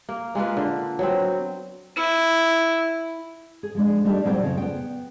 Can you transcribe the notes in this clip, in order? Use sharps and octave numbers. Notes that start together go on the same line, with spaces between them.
A#3
G#3 A#3 F4 B4
D3
F#3 B3 C4
E4
G#4
F3 G#3 D4
G3 A3 D4 D#4 F#4 G4
A#2 F#3 G3 C4 F4 G5
F2 C#3 F3
B3 G5